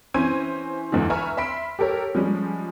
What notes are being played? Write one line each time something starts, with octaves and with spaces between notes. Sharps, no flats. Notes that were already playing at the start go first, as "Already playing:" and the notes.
E3 C4 C#4 C5 G#6 D#7
E2 G#2 D3 E3
B4 E5 G#5 A#5 C#6 F6
E5 B5 C6 B6 D7
G4 A4 A#4 C#5
F3 G3 G#3 C#4